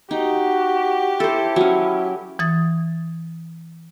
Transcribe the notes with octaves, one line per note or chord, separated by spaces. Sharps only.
D#4 F#4 G4
E4 A4 C5
F#3 C#4
E3 D#6 A6